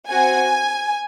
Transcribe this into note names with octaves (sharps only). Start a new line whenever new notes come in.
C4 F#4 G#5